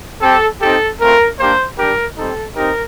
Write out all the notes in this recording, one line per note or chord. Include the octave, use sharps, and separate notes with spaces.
C4 G4 A4
C4 D#4 G4 A4
A3 C4 F4 A#4
A#3 D4 G4 C5
G3 D4 G4 A#4
G3 C4 D#4 A4
C4 D#4 G4 A#4